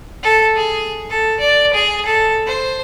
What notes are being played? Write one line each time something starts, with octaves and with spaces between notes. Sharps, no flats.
A4
G#4
A4
D5
G#4
A4
C5